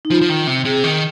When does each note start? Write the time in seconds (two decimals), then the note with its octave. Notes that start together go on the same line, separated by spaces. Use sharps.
0.05 D#4
0.10 F3 F4
0.21 F3
0.29 D#3
0.47 C3
0.65 C3 G#4
0.84 D#3